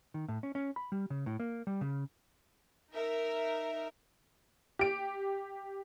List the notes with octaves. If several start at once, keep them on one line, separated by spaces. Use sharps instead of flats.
D#3
A2
C#4
C#4
B5
G3
C#3
A2
A#3
G3
C#3
D#4 A#4 E5
G4 D7